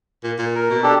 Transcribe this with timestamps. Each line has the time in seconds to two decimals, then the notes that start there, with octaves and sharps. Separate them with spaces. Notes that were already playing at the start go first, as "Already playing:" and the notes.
0.24 A#2
0.38 A#2
0.55 A#4
0.70 B2
0.83 D4 G4 A4